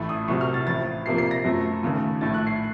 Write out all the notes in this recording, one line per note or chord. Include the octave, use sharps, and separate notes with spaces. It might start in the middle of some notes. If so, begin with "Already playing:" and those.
Already playing: A1 A2 A3
D#6
C2 C3 F#3 C#6
F6
A6
A1 A2 F3 A6
F1 F2 C3 F3 A#3 C7
C7
A#6
F#2 F3 A3
D#2 C#3 A3
A#1 A2 A3 A6
F#6
C7